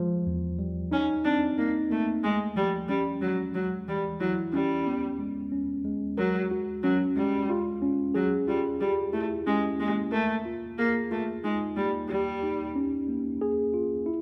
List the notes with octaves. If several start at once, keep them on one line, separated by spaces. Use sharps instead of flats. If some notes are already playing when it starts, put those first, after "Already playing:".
Already playing: F3 G#3
E2
G3
C#4 D#4
C4 D4
A#3 D#4
A3 A#3
G#3 A3
F3 G3
G3 C#4
F#3 G#3
F#3 G#3
E3 G3
F#3 E4
G3 C#4
B3
G#3
C#4
G#3
F#3 A#4
F#4
F#3 C#4
G3 G#3
F4
C#4
F#3 G#4
G3 F4
G3 G4
A3 E4
G#3 C#4
G#3 A#3
A3 A#4
F4
A#3 G#4
A3 F4
G#3 D#4
G3 A#3
G3 G4
D#4
C#4
A#3
G#4
F4
E4